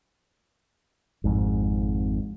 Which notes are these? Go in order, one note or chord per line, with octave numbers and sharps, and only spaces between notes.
G#1 F2 G#2